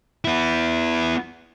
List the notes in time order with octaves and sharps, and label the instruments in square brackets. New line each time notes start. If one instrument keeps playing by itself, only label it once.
[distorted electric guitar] B3 E4